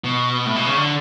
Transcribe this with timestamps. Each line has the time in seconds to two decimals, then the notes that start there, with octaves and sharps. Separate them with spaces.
0.04 B2
0.46 A2
0.56 B2
0.66 C#3
0.77 D3